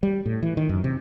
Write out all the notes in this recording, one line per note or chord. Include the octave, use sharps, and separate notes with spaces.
G3
A2
E3
D#3
F#2
C3